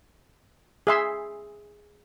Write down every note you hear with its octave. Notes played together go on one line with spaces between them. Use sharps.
G#4 E5 C6